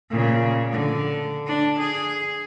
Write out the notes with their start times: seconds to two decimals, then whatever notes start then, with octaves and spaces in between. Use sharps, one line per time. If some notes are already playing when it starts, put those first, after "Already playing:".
0.10 A#2 C#3
0.71 D3
1.46 D4
1.79 G#4